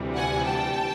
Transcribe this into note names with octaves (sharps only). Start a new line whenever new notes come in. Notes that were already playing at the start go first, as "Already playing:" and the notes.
Already playing: D2 C3 E3 G3
F#5 G#5
G5 A5